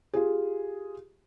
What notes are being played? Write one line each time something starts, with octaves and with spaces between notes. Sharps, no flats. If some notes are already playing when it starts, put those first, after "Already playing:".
F4 G4 G#4